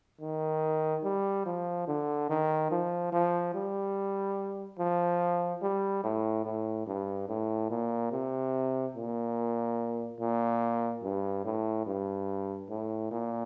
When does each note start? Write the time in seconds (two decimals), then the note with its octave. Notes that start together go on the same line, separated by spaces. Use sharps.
0.21 D#3
1.04 G3
1.46 F3
1.88 D3
2.30 D#3
2.71 F3
3.12 F3
3.55 G3
4.79 F3
5.62 G3
6.04 A2
6.45 A2
6.87 G2
7.29 A2
7.70 A#2
8.12 C3
8.95 A#2
10.20 A#2
11.03 G2
11.45 A2
11.86 G2
12.70 A2
13.11 A#2